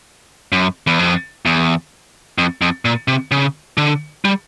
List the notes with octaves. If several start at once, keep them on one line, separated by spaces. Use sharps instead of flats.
F#2
E2
F2
E2
F2
F2
A#2
C3
C#3
D3
G3